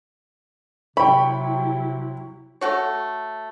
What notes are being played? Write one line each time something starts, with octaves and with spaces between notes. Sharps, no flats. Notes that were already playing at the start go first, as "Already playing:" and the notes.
C3 F#3 E4 G5 B5 C#6
A3 F#4 C#5